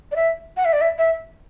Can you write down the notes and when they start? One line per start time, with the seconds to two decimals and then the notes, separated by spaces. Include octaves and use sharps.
0.12 D5
0.16 E5
0.57 F#5
0.65 E5
0.73 D5
0.81 E5
0.98 E5